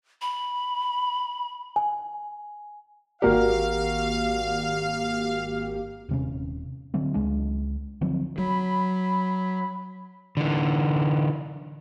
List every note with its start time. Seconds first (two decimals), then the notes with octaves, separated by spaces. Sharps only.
0.22 B5
1.76 G#5
3.22 G#1 A#3 F#4 G4 A#4 D5 F5
6.09 D#1 C3 C#4
6.94 D3 F#3 A3 C4
7.14 C#2 G#3 D4
8.01 D3 F3 F#3 C4
8.38 F#3 B5
10.37 D3 E3